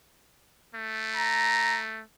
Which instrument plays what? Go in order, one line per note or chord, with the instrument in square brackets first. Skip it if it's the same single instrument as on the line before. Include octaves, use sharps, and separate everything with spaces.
[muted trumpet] A3
[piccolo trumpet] A#5